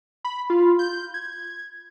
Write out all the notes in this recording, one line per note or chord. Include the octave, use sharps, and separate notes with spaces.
B5
F4
G6
G#6